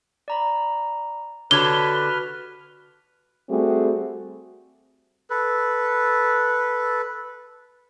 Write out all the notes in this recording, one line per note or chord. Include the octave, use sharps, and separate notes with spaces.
D5 A#5 B5
D3 F#4 G4 B4 C#5 A5 F6 G7
G3 A3 C4 F#4 G#4
A4 B4